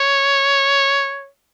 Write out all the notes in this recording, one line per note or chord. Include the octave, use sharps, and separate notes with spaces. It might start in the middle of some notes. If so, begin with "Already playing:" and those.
Already playing: C#5